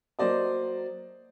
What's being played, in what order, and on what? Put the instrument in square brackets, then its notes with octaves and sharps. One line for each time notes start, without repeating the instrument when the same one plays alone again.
[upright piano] F#3 A#3 C5 D5 D#5